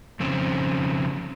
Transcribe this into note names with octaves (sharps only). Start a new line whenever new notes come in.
F2 C#3 C4